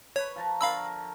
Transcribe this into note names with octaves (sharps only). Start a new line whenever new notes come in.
B4 C#5 B5 C#6
F3 A5 A#5
D3 A#4 F5 B5 C#6 E6